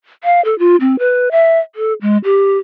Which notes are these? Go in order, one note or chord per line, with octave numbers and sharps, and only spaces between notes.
F5
A4
F4
C4
B4
E5
A4
G#3
G4